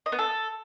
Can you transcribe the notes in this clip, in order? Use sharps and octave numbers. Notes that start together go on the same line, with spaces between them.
D#5
B3
A4